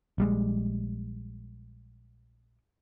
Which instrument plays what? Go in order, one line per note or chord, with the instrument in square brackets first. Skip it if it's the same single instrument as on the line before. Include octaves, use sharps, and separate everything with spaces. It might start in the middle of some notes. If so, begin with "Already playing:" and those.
[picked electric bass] A#1 G3 G#3